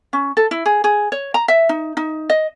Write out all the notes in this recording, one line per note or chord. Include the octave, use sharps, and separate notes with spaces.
C#4
A4
E4
G#4
G#4
C#5
A#5
E5
D#4
D#4
D#5